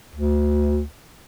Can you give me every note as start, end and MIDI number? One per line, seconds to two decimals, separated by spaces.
0.15 0.83 38